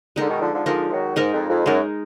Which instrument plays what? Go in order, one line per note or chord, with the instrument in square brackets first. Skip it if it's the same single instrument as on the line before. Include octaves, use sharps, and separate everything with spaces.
[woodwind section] D3 [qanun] G#3 D#4 A#4
[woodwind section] B2 D#3
D3 F3
D3 F3
[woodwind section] D3 F3 [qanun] G#3 D#4 A#4
[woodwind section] D#3 F#3
[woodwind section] G#2 [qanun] G#3 D#4 A#4
[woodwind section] F2
F2
[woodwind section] F#2 [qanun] G#3 D#4 A#4